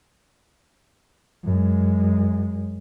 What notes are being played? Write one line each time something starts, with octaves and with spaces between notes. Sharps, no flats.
F#2 G#3